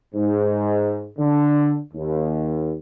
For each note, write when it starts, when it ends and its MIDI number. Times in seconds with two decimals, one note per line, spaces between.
0.14 1.07 44
1.18 1.76 50
1.93 2.74 39